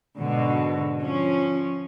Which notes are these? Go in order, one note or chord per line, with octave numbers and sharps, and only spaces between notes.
G#2 B2 D3
F3 C#4